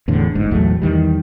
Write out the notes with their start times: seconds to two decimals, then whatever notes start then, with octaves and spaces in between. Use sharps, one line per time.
0.08 E2 A2 D3
0.35 G1 G#2
0.51 A#1 E2 F#3 A3
0.82 E2 D#3 G3